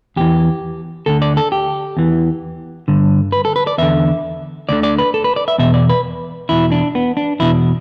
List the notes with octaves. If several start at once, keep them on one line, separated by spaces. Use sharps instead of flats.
E2 E3 G4
D2 D3 A4
D5
A4
G4
E2 E3
G2 D3
B4
A4
B4
D5
E2 D3 E5
D2 D3 D5
D5
B4
A4
B4
D5
E5
E2 B2 E5
D5
B4
E2 B2 E4
D4
B3
D4
E2 B2 E4